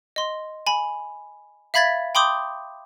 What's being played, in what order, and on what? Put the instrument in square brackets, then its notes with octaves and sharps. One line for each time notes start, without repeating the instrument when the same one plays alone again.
[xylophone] D#5 C6
G#5 B5
E5 F5 B5 G#6 A6 B6
G5 B5 C6 D6 D#6 G6